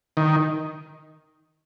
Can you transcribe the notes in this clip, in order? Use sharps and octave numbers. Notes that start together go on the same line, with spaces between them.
D#3